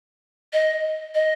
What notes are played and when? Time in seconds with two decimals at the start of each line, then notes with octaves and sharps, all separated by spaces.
0.53 D#5
1.15 D#5